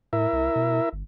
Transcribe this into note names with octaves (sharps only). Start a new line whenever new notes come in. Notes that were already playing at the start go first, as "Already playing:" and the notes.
A2 E4 A#4 E5
C2
B2
G1